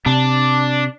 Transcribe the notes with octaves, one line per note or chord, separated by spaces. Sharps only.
C3 D4